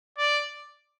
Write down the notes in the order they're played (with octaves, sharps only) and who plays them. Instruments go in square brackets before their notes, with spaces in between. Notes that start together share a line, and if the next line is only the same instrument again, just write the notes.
[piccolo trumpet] D5